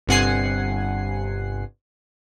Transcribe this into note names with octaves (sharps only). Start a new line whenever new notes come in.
G1 G2 C3 F#5 G#5 C7